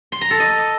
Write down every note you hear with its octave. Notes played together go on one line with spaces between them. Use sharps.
C6
A#5
A4
D#5